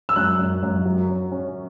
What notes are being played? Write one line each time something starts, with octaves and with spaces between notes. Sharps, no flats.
E6
F#2 F#6
F#2
F#2
F#3
C#4
C#4